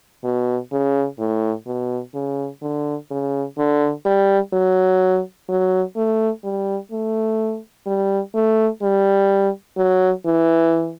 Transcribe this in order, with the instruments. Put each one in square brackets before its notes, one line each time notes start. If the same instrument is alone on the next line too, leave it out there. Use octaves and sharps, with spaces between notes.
[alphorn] B2
C#3
A2
B2
C#3
D3
C#3
D3
G3
F#3
F#3
A3
G3
A3
G3
A3
G3
F#3
E3